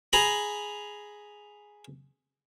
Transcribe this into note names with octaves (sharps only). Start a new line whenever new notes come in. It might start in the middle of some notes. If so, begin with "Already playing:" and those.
G#4 A#5 B5